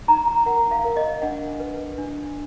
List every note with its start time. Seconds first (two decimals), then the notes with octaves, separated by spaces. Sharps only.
0.08 D#4 A#5
0.28 A#5
0.46 A#4 F#5
0.71 F5
0.84 A#4
0.97 D#5
1.22 D4 F#5
1.60 B4
1.98 D4